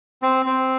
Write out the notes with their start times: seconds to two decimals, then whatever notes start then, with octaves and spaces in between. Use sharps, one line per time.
0.22 C4
0.46 C4